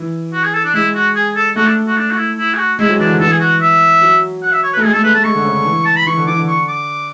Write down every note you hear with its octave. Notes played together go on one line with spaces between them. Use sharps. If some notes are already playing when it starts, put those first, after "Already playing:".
Already playing: E3
F#4
G#4
A4
D4
G#3 E4
F#4
G#4
A4
A3 F#4
D4
F#4
D4
F#4
E4
E4
G#4
F#4
G#3 E4
F#3
E3 D4
D3
E3 A4
G#4
F#4
E5
F#3
F#5
E5
C#5
B4
A3
G#3 G#4
A3 A4
A3 B4
A3 A5
G#3 C#6
D3
C#3
D3
E3
A5
B5
E3 C#6
D3
E3 D6
D3
C#6
D6